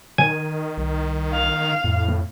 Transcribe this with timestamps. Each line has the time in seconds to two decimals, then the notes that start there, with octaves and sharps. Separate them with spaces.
0.18 D#3 G#5
0.77 C2
1.34 F5
1.84 F2 A2